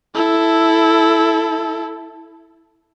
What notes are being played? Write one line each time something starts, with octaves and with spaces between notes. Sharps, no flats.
E4 A4